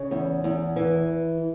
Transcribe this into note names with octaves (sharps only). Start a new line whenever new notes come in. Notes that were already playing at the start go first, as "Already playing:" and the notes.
Already playing: C#3
E2
E2
E3